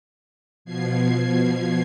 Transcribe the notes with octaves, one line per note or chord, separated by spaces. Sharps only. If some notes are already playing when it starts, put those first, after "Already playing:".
B2 F3 G#6 C7